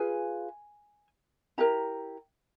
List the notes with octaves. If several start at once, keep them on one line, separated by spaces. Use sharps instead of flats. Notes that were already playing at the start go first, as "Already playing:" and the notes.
Already playing: F4 G#4 B4 G#5
E4 G4 A#4 A#5